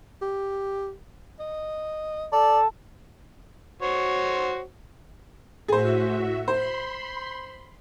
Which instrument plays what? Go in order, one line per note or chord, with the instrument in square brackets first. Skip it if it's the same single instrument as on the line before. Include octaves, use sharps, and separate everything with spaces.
[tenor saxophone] G4
D#5
[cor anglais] A4 [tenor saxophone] D5
[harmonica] F#4 C5 C#5
[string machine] A2 F#4 E5 [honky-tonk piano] G#4 C5
[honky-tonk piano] C5 [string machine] B5 C6